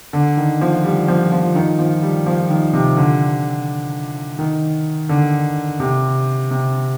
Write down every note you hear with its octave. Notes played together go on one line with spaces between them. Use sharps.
D3
D#3
F3
G3
F3
F3
D#3
F3
G3
F3
D#3
C3
D3
D#3
D3
C3
C3